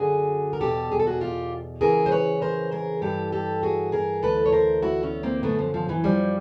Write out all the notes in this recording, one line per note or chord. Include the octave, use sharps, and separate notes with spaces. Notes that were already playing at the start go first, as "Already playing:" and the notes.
Already playing: F#2 D3 F#4 G#4
A#4
E2 B2 G4 A4
G#4
A4
F#4 G#4
F4 G4
F2 C#3 E3 G#4 A#4
C5
B4 C#5
A#4 C5
G#4 A#4
G2 E3 G4 A4
G4 A4
F#4 G#4
G#4 A#4
D2 C3 E3 A4 B4
C#5
A#4 C5
E4 F#4
B3 C#4
A#3 C4
F#2 D3 A3 B3
F3
F3
E3 F#3
F3 G3